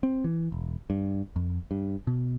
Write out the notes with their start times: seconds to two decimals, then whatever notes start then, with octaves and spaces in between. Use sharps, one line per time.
0.03 C4
0.24 E3
0.52 E1
0.90 G2
1.36 F2
1.71 G2
2.07 B2